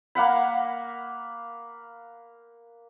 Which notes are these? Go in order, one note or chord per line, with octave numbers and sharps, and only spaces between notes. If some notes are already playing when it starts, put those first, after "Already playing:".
A#3 F5 F#5 B5